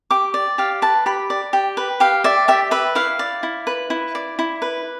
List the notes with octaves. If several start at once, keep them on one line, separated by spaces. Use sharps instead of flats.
G4 D6
D5
G4 F5
B4 A5
G4 B5
D5
G4
B4
G4 F5
D5 E5
G4 E5
B4 E5
E4 F5
D5
E4
B4
E4
D5
E4
B4